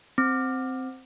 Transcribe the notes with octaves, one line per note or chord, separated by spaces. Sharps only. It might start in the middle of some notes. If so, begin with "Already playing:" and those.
C4